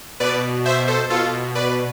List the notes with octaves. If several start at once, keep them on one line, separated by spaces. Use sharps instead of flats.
B2 B4 D5
C5 E5
A4 C5
B2 F4 A4
B4 D5